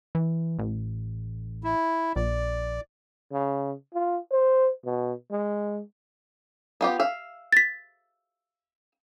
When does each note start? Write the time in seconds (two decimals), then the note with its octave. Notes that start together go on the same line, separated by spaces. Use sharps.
0.15 E3
0.59 A1
1.64 E4
2.16 A#1 D5
3.32 C#3
3.94 F4
4.32 C5
4.85 B2
5.31 G#3
6.81 B3 F4 G4
7.00 E5 F5
7.52 A6 B6